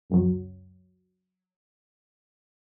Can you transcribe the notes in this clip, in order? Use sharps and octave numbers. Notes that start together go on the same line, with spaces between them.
C#2 F#2 F#3